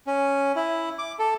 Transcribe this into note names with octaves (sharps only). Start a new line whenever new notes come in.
C#4
E4
D6
A4